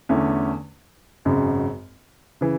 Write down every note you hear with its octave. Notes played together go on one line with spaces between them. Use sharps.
E2 D3 A3 C#4 E4
G#1 F#2 C#3 G#3
C#3 E3